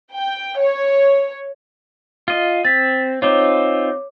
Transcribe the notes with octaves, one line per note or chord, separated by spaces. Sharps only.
G5
C#5
F4 D#5
C4 A6 B6
C4 D#4 F4 C#5 D6